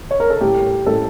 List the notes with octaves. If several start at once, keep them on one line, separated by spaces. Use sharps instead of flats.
C#5
A#4
A4
A2 G4
A2 A4